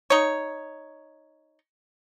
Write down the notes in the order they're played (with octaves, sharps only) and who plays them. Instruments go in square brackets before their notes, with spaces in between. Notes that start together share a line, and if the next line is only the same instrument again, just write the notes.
[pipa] D#4 C#5